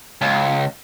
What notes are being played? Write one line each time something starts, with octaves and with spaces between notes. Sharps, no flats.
C#2